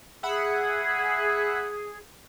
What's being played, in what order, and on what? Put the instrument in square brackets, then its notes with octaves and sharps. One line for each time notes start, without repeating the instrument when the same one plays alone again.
[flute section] G#4 [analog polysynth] E5 F#5 B5